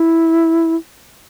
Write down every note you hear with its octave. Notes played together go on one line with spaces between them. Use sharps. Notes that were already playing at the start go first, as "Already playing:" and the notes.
Already playing: E4